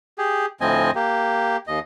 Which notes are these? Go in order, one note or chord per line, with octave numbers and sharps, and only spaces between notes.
G4 G#4
D2 A2 F3 C4 D#5 G#5
A#3 G4
D#2 D#5